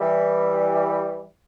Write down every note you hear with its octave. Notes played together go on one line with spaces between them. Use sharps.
E3 G3